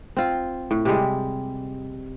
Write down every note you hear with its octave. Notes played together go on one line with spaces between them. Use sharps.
C4 F4
A2
C3 G3 G#3